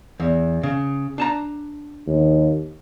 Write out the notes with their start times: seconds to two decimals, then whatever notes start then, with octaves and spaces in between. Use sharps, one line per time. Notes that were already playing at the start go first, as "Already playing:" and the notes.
0.20 E2
0.63 C#3
1.18 D4 A5 A#5
2.07 D#2